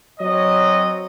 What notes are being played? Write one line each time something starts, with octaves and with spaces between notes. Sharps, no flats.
F#3 C4 C#5 D#5